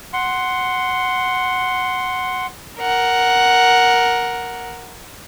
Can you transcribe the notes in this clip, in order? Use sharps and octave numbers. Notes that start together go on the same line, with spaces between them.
F#5 C6
A#4 F#5